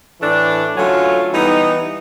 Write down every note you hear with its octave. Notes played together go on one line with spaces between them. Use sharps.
A2 E3 A3 D4
D3 F#3 A3 C#4 F4
E3 G3 B3 D#4